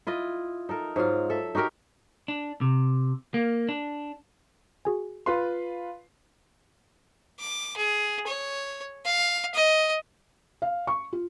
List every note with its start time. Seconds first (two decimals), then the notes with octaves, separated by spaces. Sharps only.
0.07 E4 F4 D#5
0.69 D#4 A4 A#4
0.96 G#2 F#3 F4 F5
1.30 A4 E5
1.55 D#4 F#4 G4 A#4
2.28 D4
2.61 C3
3.34 A#3
3.69 D4
4.85 F#4 G#4 G#5
5.26 F4 B4 C6
7.39 D6
7.77 G#4
8.27 C#5
9.05 F5
9.55 D#5
10.62 F5
10.87 C#6
11.13 F4